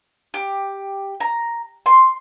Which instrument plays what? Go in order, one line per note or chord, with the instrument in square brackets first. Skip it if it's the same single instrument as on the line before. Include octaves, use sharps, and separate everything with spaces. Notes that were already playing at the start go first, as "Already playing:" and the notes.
[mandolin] G4
A#5
C6